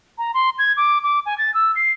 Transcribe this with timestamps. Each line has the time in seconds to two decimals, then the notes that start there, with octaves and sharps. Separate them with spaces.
0.18 A#5
0.34 C6
0.59 G#6
0.77 D6
1.04 D6
1.26 G#5
1.38 A6
1.54 E6
1.76 C7